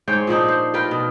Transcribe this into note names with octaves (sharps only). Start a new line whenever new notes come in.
G#2 C5 C#5 G5
A#2 F3 D4 D#4
C5
F4 A#4 B4 G5
B2